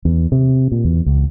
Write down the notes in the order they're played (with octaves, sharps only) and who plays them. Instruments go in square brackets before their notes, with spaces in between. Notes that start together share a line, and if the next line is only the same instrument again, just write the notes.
[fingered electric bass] E2
C3
A#2
E2
C#2